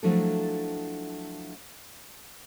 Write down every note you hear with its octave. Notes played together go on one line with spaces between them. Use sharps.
F3 F#3 A3 D4 E4 A4